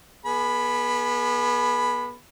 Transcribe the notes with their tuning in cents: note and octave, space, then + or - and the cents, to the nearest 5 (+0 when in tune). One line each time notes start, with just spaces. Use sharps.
B3 -35 G#4 +25 B5 +0